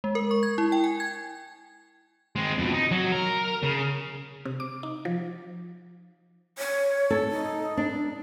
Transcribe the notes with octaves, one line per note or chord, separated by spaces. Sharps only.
G#3
A#4
C#6
G#6
E4
G5
G#5
G#6
G#3 C4
F2 B2
D#4
F#3
A#4
C#3
C3
D6
D#4
F3
C#5
A4
D#4
D4